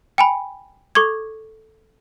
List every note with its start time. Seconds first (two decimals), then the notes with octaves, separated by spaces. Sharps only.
0.18 G5 G#5 B5
0.95 A4 C#6 D6 G#6